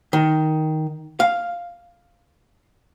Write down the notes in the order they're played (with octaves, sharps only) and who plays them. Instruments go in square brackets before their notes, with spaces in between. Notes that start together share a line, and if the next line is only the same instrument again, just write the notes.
[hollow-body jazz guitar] D#3
F5